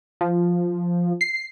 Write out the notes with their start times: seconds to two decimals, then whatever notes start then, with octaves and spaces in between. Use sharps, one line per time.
0.21 F3
1.21 C7